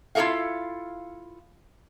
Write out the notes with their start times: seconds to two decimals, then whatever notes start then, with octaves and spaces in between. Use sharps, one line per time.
0.15 E4 F4 G#4 A4 E5 F5